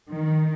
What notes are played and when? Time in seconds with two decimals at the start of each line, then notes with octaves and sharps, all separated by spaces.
0.12 D#3